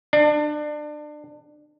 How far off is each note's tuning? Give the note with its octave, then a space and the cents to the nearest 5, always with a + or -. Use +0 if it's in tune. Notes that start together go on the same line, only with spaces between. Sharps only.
D4 +25